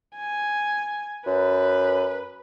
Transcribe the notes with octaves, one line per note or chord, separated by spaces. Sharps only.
G#5
F#2 B4